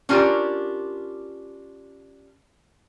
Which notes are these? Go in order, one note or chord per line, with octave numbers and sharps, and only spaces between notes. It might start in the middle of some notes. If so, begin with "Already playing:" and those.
C#4 D4 F4 G4 A#4